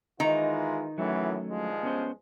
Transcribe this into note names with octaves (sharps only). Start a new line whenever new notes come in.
D#3 E3 G#3 D#4 F4 A#5
F#2 A2 E3 F#3 A3 C#4
G2 F3 G#3
B3 C#4 C5